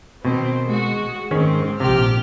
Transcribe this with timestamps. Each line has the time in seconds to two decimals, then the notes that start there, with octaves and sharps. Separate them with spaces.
0.25 B2 D#3 C4
0.66 G#3 F#4
1.31 G#2 D#3 C4 C#4 G#4
1.80 A#1 C3 G4 F6